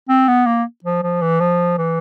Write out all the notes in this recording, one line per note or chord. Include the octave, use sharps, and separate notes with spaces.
C4
B3
A#3
F3
F3
E3
F3
E3